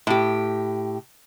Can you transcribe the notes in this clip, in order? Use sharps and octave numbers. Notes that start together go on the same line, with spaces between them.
A2 G4